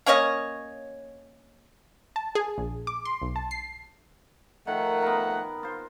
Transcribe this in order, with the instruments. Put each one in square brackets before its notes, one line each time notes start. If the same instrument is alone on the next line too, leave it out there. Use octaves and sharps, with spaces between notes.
[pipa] A#3 C#4 C#5 D#5
[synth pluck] A5
G#4
A#1
D6
C6
B1
A5
C7
[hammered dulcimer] D#3 [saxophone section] F3 A3 F#5
[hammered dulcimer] B3 A#4
F4 C5